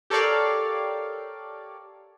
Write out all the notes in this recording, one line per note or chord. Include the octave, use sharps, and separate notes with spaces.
G4 A4 A#4 C#5 D5 F5